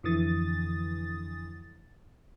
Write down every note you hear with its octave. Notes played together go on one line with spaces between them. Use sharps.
F2 D3 E3 D#6 A6